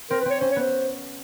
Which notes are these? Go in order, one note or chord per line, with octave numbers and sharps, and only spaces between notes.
C4 A#4
B4
C4 C#5
C#4 C5
C#5
B3 C5